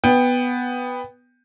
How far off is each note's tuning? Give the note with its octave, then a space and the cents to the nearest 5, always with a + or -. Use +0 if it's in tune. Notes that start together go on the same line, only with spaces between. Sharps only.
B3 +5 G5 +15